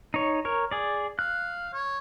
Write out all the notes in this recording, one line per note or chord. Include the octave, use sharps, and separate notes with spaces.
D#4 C#5
A#4 C#5
G#4 D5
F5 F#6
C#5